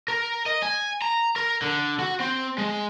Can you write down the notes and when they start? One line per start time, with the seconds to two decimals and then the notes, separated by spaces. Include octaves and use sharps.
0.08 A#4
0.46 D#5
0.62 G#5
1.02 A#5
1.36 A#4
1.62 D3
2.00 F#4
2.20 C4
2.58 G#3